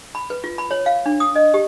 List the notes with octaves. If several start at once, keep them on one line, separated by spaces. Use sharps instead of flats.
B5
B4
F4
B5
C#5
F5
D4
D#6
D#5
G4